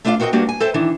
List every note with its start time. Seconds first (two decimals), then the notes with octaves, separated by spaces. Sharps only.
0.05 A3 D4 E4 F4 D5 F5
0.20 C4 F#4 A#4 C#5 D#5 G5
0.33 G3 A#3 B3 D4 F#4 G4
0.49 G#5
0.60 A4 C5 E5 G5
0.74 D#3 E3 D4